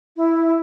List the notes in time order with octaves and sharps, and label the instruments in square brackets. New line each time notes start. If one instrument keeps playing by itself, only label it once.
[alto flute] E4